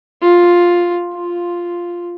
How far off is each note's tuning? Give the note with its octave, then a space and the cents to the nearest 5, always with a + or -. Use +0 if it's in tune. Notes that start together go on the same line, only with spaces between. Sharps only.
F4 +5
F4 +0